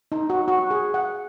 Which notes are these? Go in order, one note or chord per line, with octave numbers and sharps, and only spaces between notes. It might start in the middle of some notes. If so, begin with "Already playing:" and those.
D#4
F#4
F#4
G#4
F#5